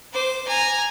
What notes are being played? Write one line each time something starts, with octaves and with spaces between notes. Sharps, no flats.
C5 D6
G#5 A#5